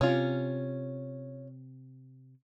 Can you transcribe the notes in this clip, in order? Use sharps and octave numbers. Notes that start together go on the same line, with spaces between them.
C3 C#4 F4